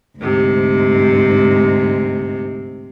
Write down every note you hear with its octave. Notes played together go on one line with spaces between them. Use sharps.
D2 G#2 C3